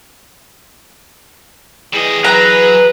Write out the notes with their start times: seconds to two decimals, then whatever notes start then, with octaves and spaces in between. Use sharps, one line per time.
1.93 E3 G3 G#4 D#5
2.24 F#3 B4 A#5